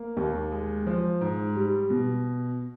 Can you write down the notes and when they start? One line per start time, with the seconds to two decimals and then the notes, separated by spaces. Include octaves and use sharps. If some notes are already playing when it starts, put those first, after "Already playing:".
Already playing: A#3
0.17 D#2
0.52 G#3
0.87 F3
1.21 G#2
1.56 G3
1.90 B2